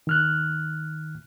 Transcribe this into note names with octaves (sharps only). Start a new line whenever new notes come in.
D#3 F6 F#6